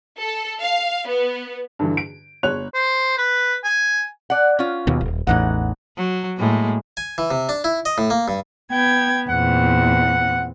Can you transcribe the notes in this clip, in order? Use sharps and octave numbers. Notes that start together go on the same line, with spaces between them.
A4
F5
B3
G2 D3 E3
D7
G1 C#5 F#6 F7
C5
B4
G#5
D5 F#5
C#4 F4
D#2 B2
D#1
A1 E2 A2 E3 D#4 F#5
F#3
A2 G#3 A#3
G#5
E3
C3
D4
E4
D#5
A2
A#3
G2
B3 G5 G#6
E2 A#2 C4 F#5